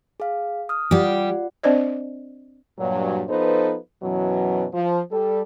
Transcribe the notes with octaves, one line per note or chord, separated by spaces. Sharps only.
G#4 F5
D#6 F6
G3 F4 G4 D5 F#5
C4 D4 C5 D5 D#5
G2 A#2 F#3
F3 B3 D#4 A4 B4 C5
F#2 B2 E3 F#3
F3
G3 A4